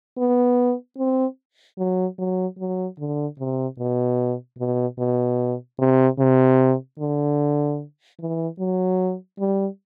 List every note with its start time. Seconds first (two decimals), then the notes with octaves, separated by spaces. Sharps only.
0.18 B3
0.98 C4
1.78 F#3
2.19 F#3
2.59 F#3
2.99 D3
3.39 C3
3.79 B2
4.59 B2
4.99 B2
5.79 C3
6.19 C3
6.99 D3
8.20 E3
8.59 F#3
9.39 G3